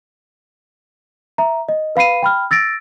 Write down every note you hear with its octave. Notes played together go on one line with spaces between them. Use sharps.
E5 A#5
D#5
B4 F5 B5 C7 D#7
G5 B5 F6
E6 A6 A#6 D7